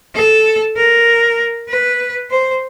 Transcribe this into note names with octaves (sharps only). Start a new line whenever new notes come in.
A4
A#4
B4
C5